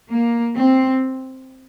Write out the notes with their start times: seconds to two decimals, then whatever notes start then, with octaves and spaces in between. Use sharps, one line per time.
0.10 A#3
0.56 C4